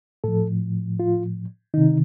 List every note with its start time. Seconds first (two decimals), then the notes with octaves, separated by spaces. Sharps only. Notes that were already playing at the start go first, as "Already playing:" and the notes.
0.24 A2 F3 A4
0.99 F4
1.74 C3 D#3 D#4